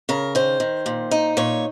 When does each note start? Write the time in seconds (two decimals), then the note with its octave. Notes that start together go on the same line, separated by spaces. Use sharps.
0.09 C#3 A#4
0.35 D#3 C5
0.60 D#3
0.86 A#2
1.11 D#4
1.37 A#2 C#5